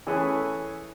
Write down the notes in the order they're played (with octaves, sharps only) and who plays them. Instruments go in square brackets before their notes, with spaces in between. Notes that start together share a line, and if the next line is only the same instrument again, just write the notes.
[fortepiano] E3 A3 C#4 G#4 A4 B4